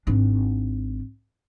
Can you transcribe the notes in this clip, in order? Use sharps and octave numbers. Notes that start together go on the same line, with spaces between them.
G#1 D4